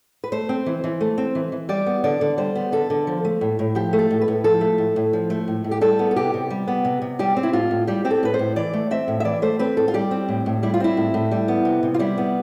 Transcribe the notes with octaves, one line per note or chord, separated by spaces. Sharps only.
B4
A3 C5
C4
E3
E3
A3
C4
E3
E3
G3 D5
B3
D3 D5
D3
G3 C5
B3
D3 A4
D3
F3
A3
A2
A2
F3 G4
A3
A4
A2
B4
A2
F3 A4
A3
A2
A2
F3
A3
A2
A2
G4
G3 A4
B3
A4
C3 G4
C3
G3
B3
C3
C3
G3 G4
C4
E4
A2 F4
A2
G3 G4
C4 G4
A4
A2 B4
C5
A2
E3 D5
A3
C4 E5
A2
E5
E3 D5
A3 C5
C4 B4
A2 A4
F4
G3 G4
C4
A2
A2
G3 E4
F4
C4 E4
A2
A2
G3
B3
C3
C3
F4
G3 E4
B3